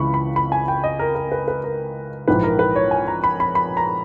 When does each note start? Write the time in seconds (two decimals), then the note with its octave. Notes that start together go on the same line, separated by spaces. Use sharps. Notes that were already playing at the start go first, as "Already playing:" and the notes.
Already playing: C#2 C#3 E3 B5 C#6
0.14 B5
0.36 B5
0.52 G#5
0.68 G5
0.84 D#5
0.99 A#4
1.15 A#4
1.32 B4
1.48 B4
1.64 A#4
2.28 A#1 G#2 E3 B4
2.43 A#4
2.59 B4
2.76 C#5
2.91 G#5
3.08 A#5
3.24 B5
3.40 B5
3.55 B5
3.77 A#5